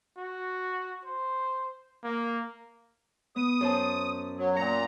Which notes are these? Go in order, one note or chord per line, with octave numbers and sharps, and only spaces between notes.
F#4
C5
A#3
B3 D#6
F#2 C5 A5
F#3
A#2 F#5 A#5